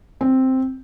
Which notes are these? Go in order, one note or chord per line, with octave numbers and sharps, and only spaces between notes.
C4